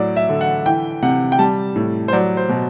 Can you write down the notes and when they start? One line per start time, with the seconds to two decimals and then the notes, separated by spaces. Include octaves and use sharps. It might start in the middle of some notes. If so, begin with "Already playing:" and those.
Already playing: A2 F#3 D5
0.16 E5
0.29 D3
0.41 F#5
0.66 E3 G5
1.03 C3 F#5
1.32 G5
1.39 G3 A5
1.76 A2
2.08 C5
2.13 F#3 D5
2.37 C5
2.49 B2